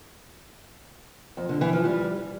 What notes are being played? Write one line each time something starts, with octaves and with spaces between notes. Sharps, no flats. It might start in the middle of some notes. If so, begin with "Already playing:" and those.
F2
D3
E3
F3
G3